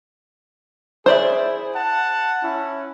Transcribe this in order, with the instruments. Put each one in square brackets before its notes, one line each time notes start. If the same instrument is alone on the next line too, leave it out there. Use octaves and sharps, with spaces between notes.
[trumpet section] E4 G#4 [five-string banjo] C5 D5 E5
[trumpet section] F#5 A5
C#4 E4